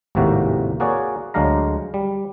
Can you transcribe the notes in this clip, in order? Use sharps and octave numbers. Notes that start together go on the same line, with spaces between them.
G#1 D#2 A2 C3 A#3 F#4
A#3 F#4 G#4 C#5 D5
D2 F#3 G#3 D4 F5 A#5
G3